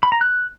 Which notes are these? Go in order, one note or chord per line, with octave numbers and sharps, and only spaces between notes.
B5
A#5
F#6